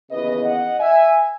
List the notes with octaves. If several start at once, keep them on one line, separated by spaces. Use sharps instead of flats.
D#2 C#3 E3 B3 B4 D#5
D#5 F#5
E5 G#5